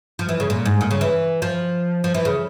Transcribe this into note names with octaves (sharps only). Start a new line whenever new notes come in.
F3
E3
C#3
A#2
G#2
A#2
C#3
E3
F3
F3
E3
C#3